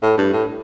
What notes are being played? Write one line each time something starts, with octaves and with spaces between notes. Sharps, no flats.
A2
G2
A2